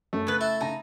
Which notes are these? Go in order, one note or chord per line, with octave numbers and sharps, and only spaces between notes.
F#2 A3
C#3 B3 B4 G#6
E4 A4
C#3 D#4 A5 A#6